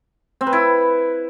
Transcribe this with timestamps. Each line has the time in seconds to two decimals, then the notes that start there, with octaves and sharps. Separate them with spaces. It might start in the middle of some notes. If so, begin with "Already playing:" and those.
0.41 C4
0.47 B4
0.53 E4